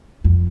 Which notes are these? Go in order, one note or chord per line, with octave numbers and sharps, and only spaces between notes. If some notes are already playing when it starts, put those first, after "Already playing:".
F2